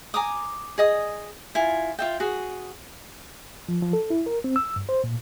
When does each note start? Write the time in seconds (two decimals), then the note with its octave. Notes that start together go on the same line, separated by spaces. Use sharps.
0.14 G#5 A#5 D6 D#6
0.78 G#4 D#5 D#6
1.55 E4 F4 G#5
1.99 F4 E5 G5
2.20 F#4 G#4
3.69 F3
3.82 F3
3.93 A4
4.10 E4
4.26 A#4
4.44 C4
4.56 E6
4.76 G2
4.89 C5
5.04 A#2